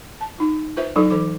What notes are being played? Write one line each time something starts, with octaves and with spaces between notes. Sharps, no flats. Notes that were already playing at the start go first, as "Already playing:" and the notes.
A5
D#4 F4
F4 B4 C5 E5
F#3 D#4 F4 A4
E3 A4 D6